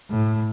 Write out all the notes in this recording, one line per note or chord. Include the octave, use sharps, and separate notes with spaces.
A2